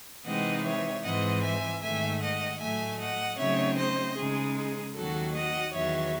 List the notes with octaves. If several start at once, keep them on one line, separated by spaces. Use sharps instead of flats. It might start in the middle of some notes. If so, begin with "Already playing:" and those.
C3 E3 G#3 C4 D#4 D#5 F#5
C#5 E5
G#2 E3 G#3 C4 D#5 F#5
E5 G#5
G#2 D#3 A3 E5 G#5
D#5 F#5
A2 F#3 A3 E5 G#5
D#5 F#5
C#3 F#3 A3 C4 D#4 C#5 E5
C5 D#5
C#3 G#3 D#4 G#4
G#4
D#2 D#3 F#3 F#4 A4
D#5 F#5
E2 D#3 F#3 C#5 E5